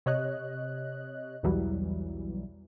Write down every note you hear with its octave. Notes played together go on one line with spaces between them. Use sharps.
C3 C#5 D#5 F#6
B1 E2 E3 F#3 G3